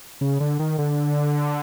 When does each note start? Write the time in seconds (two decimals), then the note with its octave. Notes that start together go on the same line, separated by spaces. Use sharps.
0.21 C#3
0.40 D3
0.59 D#3
0.78 D3